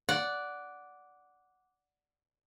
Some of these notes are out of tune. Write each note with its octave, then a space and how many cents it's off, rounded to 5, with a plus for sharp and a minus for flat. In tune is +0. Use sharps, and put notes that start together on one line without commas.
D5 -10 F#5 +0